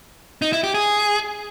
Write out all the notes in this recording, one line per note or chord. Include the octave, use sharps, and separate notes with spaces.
D#4
E4
G4
G#4